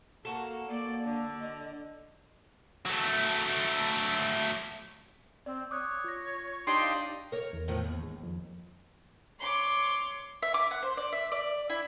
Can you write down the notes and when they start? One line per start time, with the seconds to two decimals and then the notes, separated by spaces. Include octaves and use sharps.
0.25 A#3 F#4 A4
0.70 A#3 D5
1.05 D3
1.40 D#5
2.86 F#3 A3
5.46 C4 D5
5.71 C#5 D6 D#6 F#6
6.04 F4 A#6
6.67 D4 D#4 G4 C6
6.82 F5
7.32 A#4 C#5
7.53 E2
7.68 A2 D#3 F3
7.84 D#2
8.03 G#2
8.23 F2
9.39 C#5 C6 D6
10.43 E5
10.54 D6
10.71 F#5
10.83 C5
10.97 D5
11.13 E5
11.32 D5
11.70 E4